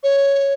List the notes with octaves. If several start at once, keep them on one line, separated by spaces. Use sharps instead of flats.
C#5